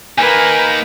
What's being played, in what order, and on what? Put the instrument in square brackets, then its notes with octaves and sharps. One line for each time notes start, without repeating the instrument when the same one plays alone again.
[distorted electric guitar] A#3 D#4 [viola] A#4 B4 [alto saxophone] G#5